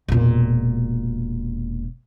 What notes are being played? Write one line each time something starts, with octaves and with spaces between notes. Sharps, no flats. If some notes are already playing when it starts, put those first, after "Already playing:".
E1 A#2